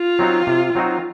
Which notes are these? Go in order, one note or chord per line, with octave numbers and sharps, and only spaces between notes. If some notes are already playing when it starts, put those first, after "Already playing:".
Already playing: F4
F#3 C4 D#4 F#4
C3
F#3 C4 D#4 F#4